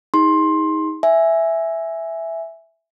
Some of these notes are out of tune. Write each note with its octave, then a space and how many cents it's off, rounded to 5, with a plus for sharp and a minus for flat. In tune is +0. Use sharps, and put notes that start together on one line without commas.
D#4 +30 G#4 -25 C6 +15
E5 +0 G#5 +0